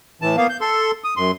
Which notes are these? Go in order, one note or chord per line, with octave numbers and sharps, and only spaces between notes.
A2 E3 A5
A#3 B3 F5
G6
A4 C6
D#6
F#2 C6